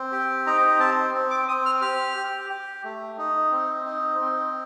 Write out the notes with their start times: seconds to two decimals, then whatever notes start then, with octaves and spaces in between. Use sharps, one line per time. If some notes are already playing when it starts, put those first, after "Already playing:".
Already playing: C4
0.12 G4
0.47 D#4 A#5
0.80 C4 A5
1.14 C4
1.31 D6
1.48 C4 D#6
1.66 F6
1.82 G4 F6
2.17 G4
2.50 G4
2.84 A3
3.18 D#4
3.51 C4
3.86 D#4
4.21 C4